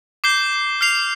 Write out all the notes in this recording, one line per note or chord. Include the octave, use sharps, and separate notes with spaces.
D6 G6 C7 G7
F6 C7 F7